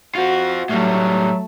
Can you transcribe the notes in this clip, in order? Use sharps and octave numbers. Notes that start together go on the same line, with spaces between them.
C4 F4 F#4
A2 F#3 G3 A3